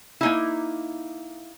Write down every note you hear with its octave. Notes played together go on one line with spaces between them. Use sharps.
A#3 D#4 E4